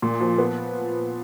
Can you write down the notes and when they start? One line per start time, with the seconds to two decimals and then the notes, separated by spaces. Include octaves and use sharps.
0.02 A#2
0.21 F3
0.38 B3